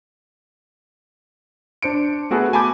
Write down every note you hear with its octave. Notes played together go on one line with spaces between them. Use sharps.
D4 C5 C#7 D7
A3 B3 F#4 G#4 A4 B4
G#5 A5 B5 D6 G6